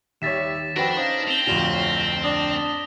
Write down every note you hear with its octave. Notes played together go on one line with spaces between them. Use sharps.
D#2 G3 C#5 E5 A6 B6 E7
F2 D4 F#4 B4 G5 A#6
C#4 D#4 C5 F5
C4 F7 G7
D1 F2 F4 F#4 C#5 F7
D4 D#6